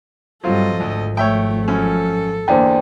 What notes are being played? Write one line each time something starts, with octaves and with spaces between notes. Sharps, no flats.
G2 F#3 G3 C4 F4 A4 D#5
G#1 D2 F3
A3 C#5 E5 G5
F#2 C#4 A4
E2 D3 A#3 C5 D5 G5